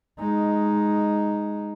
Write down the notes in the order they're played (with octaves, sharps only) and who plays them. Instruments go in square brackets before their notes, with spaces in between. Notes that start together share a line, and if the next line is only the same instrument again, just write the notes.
[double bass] G#3 D#4